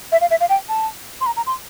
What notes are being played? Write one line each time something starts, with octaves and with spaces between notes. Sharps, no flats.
E5
F5
E5
F5
G5
A5
C6
A#5
A#5
C6